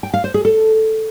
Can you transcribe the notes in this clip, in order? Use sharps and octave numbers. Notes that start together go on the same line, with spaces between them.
G5
F5
C5
G#4
A4